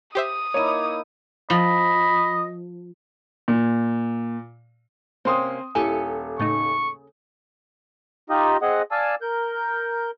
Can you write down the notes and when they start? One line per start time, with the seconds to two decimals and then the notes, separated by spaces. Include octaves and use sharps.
0.15 G4 C5 E5 D#6
0.54 A#3 D#4 E4 C#5 D#7
1.50 F3 D#5 B5
3.48 A#2
5.25 C3 A#3 C4 C#4 C6 D#6
5.75 D#1 E4 G4 A4 G#5 C#7
6.39 A2 C#3 A3 D#4 C#6
8.30 D#4 F4 G4 D#5
8.62 C4 G#4 D#5 F#5
8.91 D5 F5 G#5 A5 E6
9.22 A#4 G6